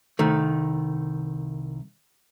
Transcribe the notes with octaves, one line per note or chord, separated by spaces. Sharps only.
C2 D#3 A3